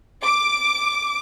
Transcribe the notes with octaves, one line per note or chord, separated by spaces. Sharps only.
D6